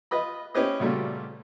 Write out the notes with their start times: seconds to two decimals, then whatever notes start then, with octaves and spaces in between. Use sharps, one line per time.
0.11 F4 B4 D#5 B5
0.55 C#4 E4 G4 B4 C5 D#5
0.80 A#2 C#3 G3 A3 F4 F#4